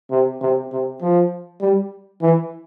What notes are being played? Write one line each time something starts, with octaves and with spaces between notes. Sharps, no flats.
C3
C3
C3
F3
G3
E3